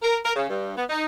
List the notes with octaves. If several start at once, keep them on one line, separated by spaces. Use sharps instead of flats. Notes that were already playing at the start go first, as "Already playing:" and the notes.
A#4
A#4
C#3
G2
B3
D#4